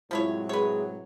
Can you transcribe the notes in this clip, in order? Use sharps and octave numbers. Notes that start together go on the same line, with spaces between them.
A2 C3 F3 F#3 G#3 E4 C#5
G#4 B4 C#5